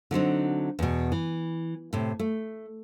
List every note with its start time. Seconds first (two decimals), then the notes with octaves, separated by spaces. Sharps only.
0.11 D3 F#3 C4 D#4
0.79 E2 B2
1.12 E3
1.93 A2 C3
2.19 A3